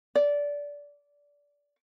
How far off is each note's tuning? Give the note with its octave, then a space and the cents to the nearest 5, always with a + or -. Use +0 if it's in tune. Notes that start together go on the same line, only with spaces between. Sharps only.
D5 -20